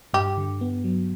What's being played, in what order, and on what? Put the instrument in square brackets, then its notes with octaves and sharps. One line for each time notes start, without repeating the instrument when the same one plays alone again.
[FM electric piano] G2 [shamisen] G4
[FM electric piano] D3
B3
F#3